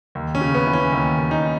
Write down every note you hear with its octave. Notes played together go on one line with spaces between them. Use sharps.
D#2
C#4
C#3
B3
E3
C#4
D#2
D#2
D#4